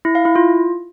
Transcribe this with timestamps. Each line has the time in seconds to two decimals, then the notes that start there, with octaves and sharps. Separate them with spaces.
0.05 E4
0.15 F5
0.25 E4
0.36 F4